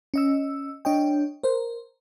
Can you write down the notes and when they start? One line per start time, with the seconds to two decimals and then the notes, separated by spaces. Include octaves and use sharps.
0.14 C#4 D#5 E6
0.85 D4 C#5 D#5 G5
1.43 A#4 C5